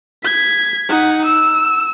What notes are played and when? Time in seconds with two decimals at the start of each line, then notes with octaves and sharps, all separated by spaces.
0.23 G#6 B6
0.89 D#4 F#5
1.25 E6